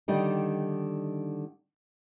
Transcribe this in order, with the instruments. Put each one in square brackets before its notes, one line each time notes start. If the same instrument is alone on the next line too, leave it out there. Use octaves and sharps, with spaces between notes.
[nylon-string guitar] D3 D#3 G3 D#4